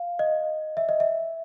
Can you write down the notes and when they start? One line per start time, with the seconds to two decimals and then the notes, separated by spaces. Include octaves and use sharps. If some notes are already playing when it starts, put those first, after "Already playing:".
Already playing: F5
0.19 D#5
0.77 E5
0.89 D#5
1.00 E5